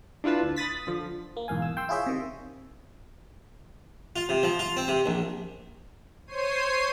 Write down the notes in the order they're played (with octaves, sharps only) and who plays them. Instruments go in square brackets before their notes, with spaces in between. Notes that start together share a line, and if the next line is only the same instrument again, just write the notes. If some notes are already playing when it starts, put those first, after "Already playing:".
[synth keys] D4 E4 F4 B4 A5
D2
B5 D#6 A6 B6
D3 F3
[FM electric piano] A#3
B1 E2 G#2 F5 G#5
E6
G5 C6 E6
E4 F4 G#4 C#5 E5
C3 D#3
[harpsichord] F4
C3
F3
F4
C4
C3
A#1
[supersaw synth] C5 C#5 C7 D#7